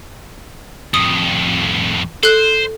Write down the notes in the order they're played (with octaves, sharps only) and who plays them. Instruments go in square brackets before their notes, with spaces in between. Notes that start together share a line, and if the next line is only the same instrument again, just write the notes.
[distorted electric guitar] F2 A2 [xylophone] D#6
[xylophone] A4 F#6 [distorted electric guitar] C5